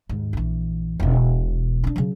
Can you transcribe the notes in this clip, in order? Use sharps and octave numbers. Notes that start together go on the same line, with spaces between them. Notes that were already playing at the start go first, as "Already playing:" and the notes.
D#2 G#2
A#1 E3
E1 B2
D4 D#4
C#3 F#3